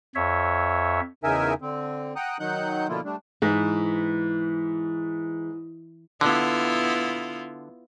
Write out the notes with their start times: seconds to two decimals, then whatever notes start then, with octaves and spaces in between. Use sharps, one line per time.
0.15 F2 C#5 E5
1.24 E2 C#3 D#4 A#4 E5 G#5
1.61 D3 C4
2.16 F#5 G5 A#5 D#6 F#6
2.40 D#3 F#3 D#4 F#5 F#6 G6
2.89 B2 D3 F3 A#3 E4 F4
3.05 G3 A3 D4
3.42 G#2 E3
6.21 D3 B3 E4 F4